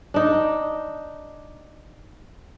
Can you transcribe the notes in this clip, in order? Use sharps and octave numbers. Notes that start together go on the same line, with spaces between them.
D4 D#4